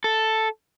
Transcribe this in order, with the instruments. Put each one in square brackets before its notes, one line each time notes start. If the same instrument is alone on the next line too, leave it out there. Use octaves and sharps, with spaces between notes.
[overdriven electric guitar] A4